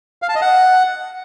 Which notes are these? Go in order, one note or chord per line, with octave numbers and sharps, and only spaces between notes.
F5
A5
D#5
F#5